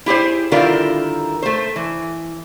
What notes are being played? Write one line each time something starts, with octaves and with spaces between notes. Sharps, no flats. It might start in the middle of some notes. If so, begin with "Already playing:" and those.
E4 G4 G#4 C5
D3 D#3 G3 E4 F4 A#4
A3 C5
E3